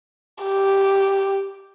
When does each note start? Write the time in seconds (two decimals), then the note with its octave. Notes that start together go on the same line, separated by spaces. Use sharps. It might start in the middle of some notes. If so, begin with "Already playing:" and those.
0.44 G4